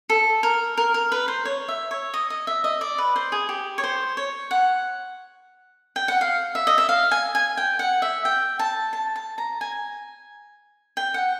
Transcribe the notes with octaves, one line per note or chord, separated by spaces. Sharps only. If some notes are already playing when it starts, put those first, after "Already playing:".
A4
A#4
A#4
A#4
B4
C5
C#5
E5
C#5
D#5
D#5
E5
D#5
D5
B4
C5
G#4
G4
C#5
C5
C#5
F#5
G5
F#5
F5
E5
D#5
E5
F5
G#5
G#5
G5
F#5
E5
G5
A5
A5
A5
A#5
G#5
G5
F#5